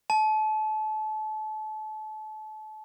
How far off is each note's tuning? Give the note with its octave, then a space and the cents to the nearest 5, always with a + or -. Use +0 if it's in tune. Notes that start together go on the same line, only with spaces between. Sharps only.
A5 -30